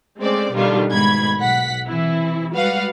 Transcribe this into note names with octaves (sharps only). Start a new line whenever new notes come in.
G#3 A3 C4 C#4 C5 D5
B2 D3 D#3 G3 D4 F4
G#2 B2 D#3 A3 B5 G#6
B1 F#5 B6
C3 E3 E4
G3 G#3 F#4 B4 F5 F#5